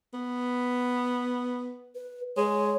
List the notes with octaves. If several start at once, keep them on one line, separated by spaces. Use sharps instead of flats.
B3
B4
G#3 C#5